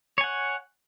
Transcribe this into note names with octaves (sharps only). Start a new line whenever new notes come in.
C#5 F#5 G#5